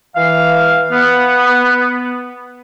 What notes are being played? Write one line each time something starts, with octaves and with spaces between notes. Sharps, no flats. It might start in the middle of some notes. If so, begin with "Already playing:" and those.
E3 F5
B3